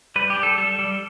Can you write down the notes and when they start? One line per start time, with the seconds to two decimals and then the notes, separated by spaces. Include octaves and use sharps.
0.16 G3 B4
0.30 G4
0.36 D4
0.43 A4
0.58 G3 A4
0.79 G3